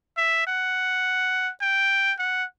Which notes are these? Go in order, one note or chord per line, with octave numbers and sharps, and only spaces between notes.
E5
F#5
G5
F#5